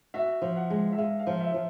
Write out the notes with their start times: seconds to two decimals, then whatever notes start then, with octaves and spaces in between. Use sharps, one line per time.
0.14 F#4 E5
0.42 F3
0.56 F#5
0.70 G#3
0.93 E5
0.98 G#3 F5
1.19 F5
1.27 F3
1.41 E5
1.54 F3